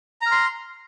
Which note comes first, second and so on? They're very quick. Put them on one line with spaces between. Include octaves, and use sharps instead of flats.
A#5 F6 C6